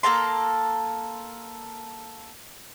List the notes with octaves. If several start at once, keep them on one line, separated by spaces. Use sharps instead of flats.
A#3 A4 A#5 C6